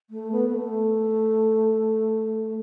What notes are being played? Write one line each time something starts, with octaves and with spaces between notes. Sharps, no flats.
A3
B3
B3
A3